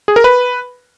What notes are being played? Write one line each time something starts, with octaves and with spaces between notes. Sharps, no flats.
G#4
A#4
B4